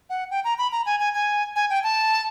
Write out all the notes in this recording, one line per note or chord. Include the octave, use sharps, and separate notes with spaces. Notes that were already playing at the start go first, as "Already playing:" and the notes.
F#5
G5
A#5
B5
A#5
G#5
G#5
G#5
G#5
G5
A5